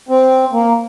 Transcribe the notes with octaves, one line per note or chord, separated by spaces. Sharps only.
C4
A#3